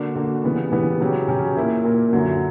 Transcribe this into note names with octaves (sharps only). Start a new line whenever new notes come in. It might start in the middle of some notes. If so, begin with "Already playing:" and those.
Already playing: D3 A#3 D4 F#4
D3 A#3 D4 F#4
C#3 E3 G3 B3
C#3 E3 G3 B3
C#3 F#3 C#4 G4
C#3 F#3 C#4 G4
A#2 A#3 E4
A#2 A#3 E4
F#2 D3 F#3